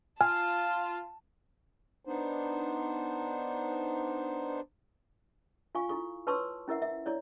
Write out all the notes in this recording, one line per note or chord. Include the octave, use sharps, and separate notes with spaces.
F4 G#5 A5 F6
B3 D4 D#4 C5
F4 F5 G#5 C#6
E4 F4 A4 C#6
B4 C#5 A5 C6 C#6 E6
C#4 E4 A#4 E5 F#5
E5
E4 C#5 D5